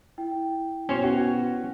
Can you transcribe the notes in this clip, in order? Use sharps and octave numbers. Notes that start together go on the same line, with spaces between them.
E4 G5
B2 C#4 C5 C#5
F#4